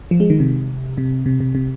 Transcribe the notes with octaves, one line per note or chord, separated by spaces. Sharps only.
F3
G#3
D#3
C3
C3
C3
C3
C3